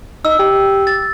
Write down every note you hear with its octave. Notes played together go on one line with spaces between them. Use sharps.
D#4 E6
G4
A6